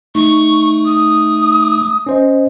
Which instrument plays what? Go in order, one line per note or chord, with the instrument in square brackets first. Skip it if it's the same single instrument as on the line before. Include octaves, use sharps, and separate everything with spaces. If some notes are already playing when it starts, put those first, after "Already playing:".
[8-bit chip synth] A3 [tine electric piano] D#4 [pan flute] C#6
[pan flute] D#6
[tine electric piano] C#4 C5 D#5